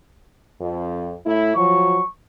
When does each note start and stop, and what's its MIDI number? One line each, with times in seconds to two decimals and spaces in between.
0.61 1.14 41
1.26 1.54 45
1.26 1.54 57
1.26 1.54 64
1.56 2.00 53
1.56 2.00 54
1.56 2.09 85